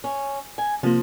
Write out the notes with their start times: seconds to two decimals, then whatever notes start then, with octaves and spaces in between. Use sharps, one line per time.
0.04 C#4
0.58 G#5
0.83 C3 F3 A#3